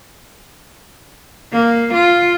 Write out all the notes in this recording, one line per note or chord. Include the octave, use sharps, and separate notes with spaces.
A#3
F4